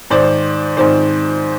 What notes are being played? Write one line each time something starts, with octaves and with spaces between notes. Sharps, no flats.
G#2 D#3 C5 D5
G#2 D#3 C5 D5